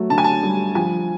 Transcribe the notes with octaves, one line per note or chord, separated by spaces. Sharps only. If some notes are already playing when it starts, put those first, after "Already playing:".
Already playing: F#3 A3
D3 A5
G#5
A5
G3
F3 G#5